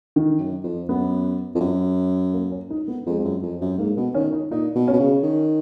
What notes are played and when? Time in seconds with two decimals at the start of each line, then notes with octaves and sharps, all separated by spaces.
0.16 D#3
0.40 F#2
0.64 F2
0.89 F#2 B3
1.55 F2
1.61 F#2
2.33 A#3
2.51 C#4
2.70 D#4
2.88 B3
3.07 F2 G#3
3.20 F2
3.24 F#2
3.43 F2
3.61 F#2
3.78 G#2 A#3
3.97 B2 B3
4.14 D#3 C#4
4.33 D#4
4.51 A#2 D#4
4.75 B2
4.88 C#4
4.94 B2
5.00 C#3
5.23 D#3